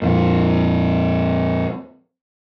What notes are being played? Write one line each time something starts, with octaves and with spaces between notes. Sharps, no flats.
F2 A#2